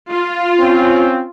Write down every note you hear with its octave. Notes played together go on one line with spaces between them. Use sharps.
F4
C4 C#4